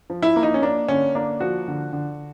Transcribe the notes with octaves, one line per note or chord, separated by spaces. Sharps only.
F3
E4
A#3
D#4
C#4
A#3 D4
D3 C#4
A#3 D4
F3 F#4
D3
D3